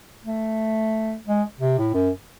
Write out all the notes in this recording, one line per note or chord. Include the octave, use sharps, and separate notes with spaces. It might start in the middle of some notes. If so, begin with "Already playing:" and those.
A3
G#3
C3
A2
F#2